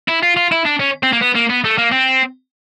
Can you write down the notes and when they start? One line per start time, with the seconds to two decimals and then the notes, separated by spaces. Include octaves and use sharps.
0.09 E4
0.23 F4
0.37 F4
0.52 E4
0.65 D4
0.79 C#4
1.03 C4
1.13 A#3
1.21 B3
1.35 A#3
1.50 B3
1.65 A3
1.78 A#3
1.92 C4